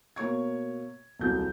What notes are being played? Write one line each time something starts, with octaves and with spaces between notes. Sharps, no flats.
B2 A#3 C#5 C#6 G#6
D#1 C2 F#3 G6